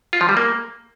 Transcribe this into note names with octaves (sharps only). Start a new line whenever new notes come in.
F4
F3
G3
A#3